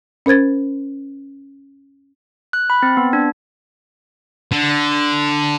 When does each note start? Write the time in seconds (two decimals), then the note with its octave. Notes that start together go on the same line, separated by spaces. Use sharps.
0.26 C#4 A#4 C5 G#6 A6
2.53 F#6
2.70 B5
2.82 C4
2.97 B3
3.13 D4
4.52 D3